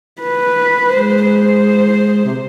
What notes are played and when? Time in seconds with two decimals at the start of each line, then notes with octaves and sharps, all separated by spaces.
0.22 B4
0.89 G#3 C5
1.24 C5
2.25 C3